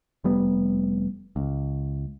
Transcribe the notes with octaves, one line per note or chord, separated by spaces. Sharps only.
F1 G3 B3
C#2